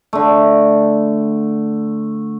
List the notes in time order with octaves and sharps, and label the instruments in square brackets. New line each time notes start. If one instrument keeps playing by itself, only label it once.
[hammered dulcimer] D3 A3